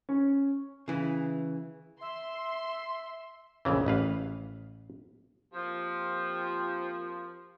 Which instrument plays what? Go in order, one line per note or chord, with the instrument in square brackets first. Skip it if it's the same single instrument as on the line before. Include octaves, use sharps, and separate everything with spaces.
[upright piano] C#4
[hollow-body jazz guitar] C#3 E3
[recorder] E5 [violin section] C6
[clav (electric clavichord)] A#1 F2 C#3 E3
A1 B4 F5
[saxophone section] F3 [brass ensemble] A#3 C4 G4